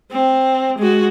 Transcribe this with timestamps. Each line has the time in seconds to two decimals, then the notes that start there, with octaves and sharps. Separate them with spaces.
0.12 C4
0.78 G#3 F#4